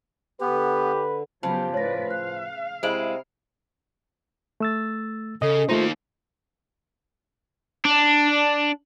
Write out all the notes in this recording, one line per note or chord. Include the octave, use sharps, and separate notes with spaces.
D3 B3 G4 B4
C#3 F3 F#3 B3 G4 A5
A2 B4 C#5 D5 A#6
F5 F#6
C3 G#3 E4 D7 F#7
A3 E6 A6
C#3 A4 D#5
A3 A#3 D#4 F4 C5
D4